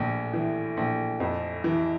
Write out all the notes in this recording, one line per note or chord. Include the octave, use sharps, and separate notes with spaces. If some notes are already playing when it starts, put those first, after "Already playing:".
Already playing: A#1 A2
E3
A#1
F2
E3